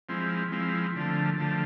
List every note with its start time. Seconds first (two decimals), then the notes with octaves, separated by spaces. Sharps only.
0.09 F3 G#3 C4 E4
0.52 F3 G#3 C4 E4
0.96 D3 F3 A3
1.38 D3 F3 A3